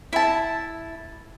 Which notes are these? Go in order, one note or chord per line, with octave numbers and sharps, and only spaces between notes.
E4 A5